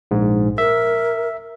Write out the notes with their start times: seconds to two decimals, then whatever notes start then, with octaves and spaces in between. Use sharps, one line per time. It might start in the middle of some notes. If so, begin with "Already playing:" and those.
0.11 A#1 G#2
0.58 A#4 E5